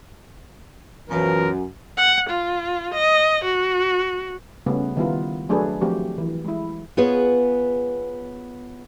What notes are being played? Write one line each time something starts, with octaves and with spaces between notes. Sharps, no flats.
F#2 B2 E3 F3 A#4
F#5
F4
D#5
F#4
C#3 G3 A3 B3 C#4
D#3 G3 B3 E4 F4 A#4
F#3 A3 D4 G#4 A4 B4
F3 F#3 A3 C4 F#4 G4
E3
G#3 E4
B3 F4 G#4 B4 C#5